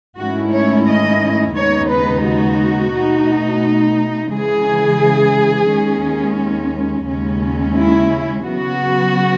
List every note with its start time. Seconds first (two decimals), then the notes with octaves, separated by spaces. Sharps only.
0.19 G#2 D#3 A3 C#4 E4 F#4
0.53 C#5
0.87 D#5
1.56 D#2 C#3 G#3 B3 D#4 C#5
1.91 B4
2.26 F#4
2.95 B2 A3 D#4
4.32 C#3 E3 G#3 G#4
5.69 D#2 D#3 G#3 C#4
7.07 D#2 C#3 G#3 C#4
7.76 E4
8.45 C#3 F#3 B3 F#4